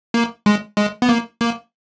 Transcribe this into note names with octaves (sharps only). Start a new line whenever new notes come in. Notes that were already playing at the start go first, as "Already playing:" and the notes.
A#3
G#3
G#3
B3
A#3
A#3